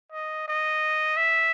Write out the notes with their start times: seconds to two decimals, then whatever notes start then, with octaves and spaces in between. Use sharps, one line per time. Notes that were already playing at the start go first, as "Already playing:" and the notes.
0.12 D#5
0.48 D#5
1.17 E5